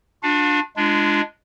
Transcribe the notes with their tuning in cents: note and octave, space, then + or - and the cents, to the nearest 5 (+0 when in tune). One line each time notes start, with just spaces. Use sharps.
D4 +0 F4 +45 F5 +35
G#3 +0 D4 +0 F4 -30